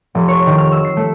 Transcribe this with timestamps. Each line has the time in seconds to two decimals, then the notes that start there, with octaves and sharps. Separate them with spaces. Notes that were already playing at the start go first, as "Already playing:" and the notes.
0.15 F1
0.28 C#5
0.47 D#3
0.58 F6
0.72 E6
0.85 C7
0.97 A3